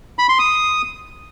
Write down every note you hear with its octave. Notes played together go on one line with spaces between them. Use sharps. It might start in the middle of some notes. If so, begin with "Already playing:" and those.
B5
C6
D#6